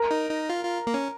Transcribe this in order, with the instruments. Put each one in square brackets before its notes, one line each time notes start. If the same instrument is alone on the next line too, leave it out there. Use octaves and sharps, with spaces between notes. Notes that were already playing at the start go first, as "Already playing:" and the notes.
Already playing: [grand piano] A#4
[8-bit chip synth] D#4
D#4
F4
F4
A#3
C#4